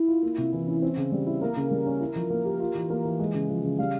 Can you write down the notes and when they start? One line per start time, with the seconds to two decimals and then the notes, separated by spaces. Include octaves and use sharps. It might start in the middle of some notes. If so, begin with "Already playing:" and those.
Already playing: E4
0.08 F4
0.23 A#3
0.38 C3
0.53 E3
0.67 C#4
0.82 C4
0.97 C#3
1.12 G3
1.27 E4
1.42 A#3 A#4
1.56 C#3
1.71 G3
1.86 C#4
2.01 E4
2.16 F3
2.30 A#3
2.45 G4
2.60 F4
2.75 E3
2.90 A#3
3.05 E3
3.19 G#3
3.34 C#3
3.49 F3
3.64 C#3
3.78 G3 F5